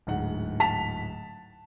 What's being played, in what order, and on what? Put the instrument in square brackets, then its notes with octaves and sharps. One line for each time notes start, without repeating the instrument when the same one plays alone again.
[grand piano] D1 G#2 F#5
[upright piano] A5 B6 F7